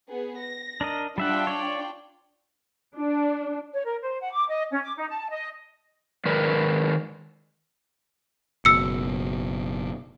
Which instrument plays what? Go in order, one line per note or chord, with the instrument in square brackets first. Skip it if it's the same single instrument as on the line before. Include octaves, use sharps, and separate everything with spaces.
[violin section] B3 G#4
A#6
[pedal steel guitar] D4 A#4 D#5
[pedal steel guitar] G3 E5 F#5 [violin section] D4 F4 G5
[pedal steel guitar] C#5 D5
[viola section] D4
[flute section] C#5
A#4
C5
F#5
D6
D#5
C#4
D6
D#4
A5
D#5
[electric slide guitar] D#3 G#3 A#4 B4 D5
[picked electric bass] F#1 B2 [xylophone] E6 C#7